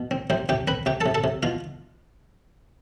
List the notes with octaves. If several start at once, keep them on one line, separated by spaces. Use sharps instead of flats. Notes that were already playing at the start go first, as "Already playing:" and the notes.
Already playing: B2
C4
C3 C4 C5
C3 G4 G5
C4 B4 B5
C3 G4 G5
A4 A5
C3
A4 A5
C3
B2 F4 F5